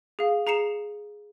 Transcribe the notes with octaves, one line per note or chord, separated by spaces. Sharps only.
G#4 F5
G#4 A#5 C7 C#7 E7 F7